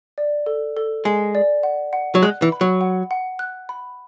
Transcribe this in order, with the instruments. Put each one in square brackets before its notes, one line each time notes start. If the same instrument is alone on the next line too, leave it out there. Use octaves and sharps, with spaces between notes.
[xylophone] D5
A4
A4
[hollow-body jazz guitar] G#3 [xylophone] G#5
[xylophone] D5
F#5
F#5
[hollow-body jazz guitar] F#3
[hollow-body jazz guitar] G#3 [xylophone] F#6
[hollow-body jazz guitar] E3
[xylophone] B5
[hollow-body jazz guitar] F#3
[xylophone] F#5
F#5
F#6
B5